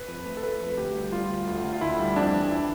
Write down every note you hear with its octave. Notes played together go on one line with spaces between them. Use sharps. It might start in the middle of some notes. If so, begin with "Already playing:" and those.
Already playing: B4
F2
A3
A4
A3 B4
F2
D2 G4
G3
G3 F4
D2
D2
D2
F4
D2 E4
G3
F2 D4
E3
E4